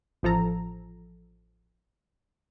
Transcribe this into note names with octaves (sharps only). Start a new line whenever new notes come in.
A1 F3 A4 A#5